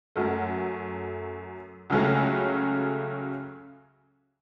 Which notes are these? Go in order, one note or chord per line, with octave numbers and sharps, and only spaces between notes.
F#2 F#3 A3
C#2 C#3 F#3 A3 C#4